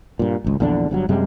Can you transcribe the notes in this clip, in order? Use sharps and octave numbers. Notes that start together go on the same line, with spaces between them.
G2 A#2
G#1 C#2
A#1 E2 D3 D4
G1 G2 B2 F#3
F#2 C3 G3 G#3